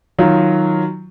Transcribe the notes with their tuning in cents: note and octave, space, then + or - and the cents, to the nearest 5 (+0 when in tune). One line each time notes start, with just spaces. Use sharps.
D#3 +0 F#3 +0 F4 -5